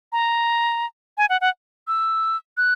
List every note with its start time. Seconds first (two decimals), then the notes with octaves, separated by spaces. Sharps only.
0.12 A#5
1.18 G#5
1.30 F#5
1.41 F#5
1.88 E6
2.57 F#6